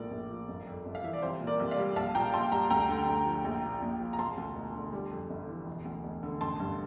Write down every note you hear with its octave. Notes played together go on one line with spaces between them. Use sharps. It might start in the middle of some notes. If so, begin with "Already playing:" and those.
Already playing: A#1 A2 F3 A#4 D5
A#1
F3
G1
F2
G1
F5
E3 E5
D5
C2 C5
A#2
A#4 D5
C2
D5 F5
G3
A#1 F5 A5
A#2 G5 A#5
A#1 A5 C6
G3 G5 A#5
D2 G5 A#5
D3
D2
F3
A#1
A#2
A#1
F3
A#5
E1 A5 C6
D2
E1
D3
G3
F2
G1
E3
E1
D2
E1
D3
A1 A5 C6
G2